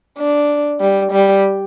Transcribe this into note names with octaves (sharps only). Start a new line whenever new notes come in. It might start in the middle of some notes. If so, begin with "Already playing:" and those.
D4
G3
G3